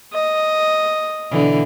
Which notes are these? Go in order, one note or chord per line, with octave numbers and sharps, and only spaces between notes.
D#5
B2 D3 E3